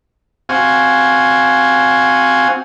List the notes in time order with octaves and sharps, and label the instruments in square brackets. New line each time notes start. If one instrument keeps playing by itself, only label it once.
[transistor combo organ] C4 F#4 F5 G#5